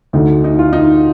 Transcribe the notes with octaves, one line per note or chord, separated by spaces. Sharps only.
D2 D3 D#4
D#4
F4
D#4